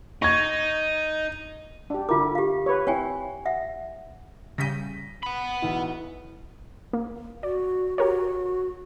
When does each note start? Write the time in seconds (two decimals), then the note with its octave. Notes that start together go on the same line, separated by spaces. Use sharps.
0.22 D#4 C#6 G#6
1.90 D4 G4
2.09 D3 E4 F4 A#4 D6
2.35 G4 F5
2.66 B4 C#5
2.87 C4 E4 C#5 G5 G#5
3.46 E5 F#5
4.58 C#3 G3 G6 A#6 B6 D#7
5.23 F#5 B5
5.62 B1 E3
6.93 A#3
7.43 F#4 D5
7.98 F#4 G4 A#4 C#5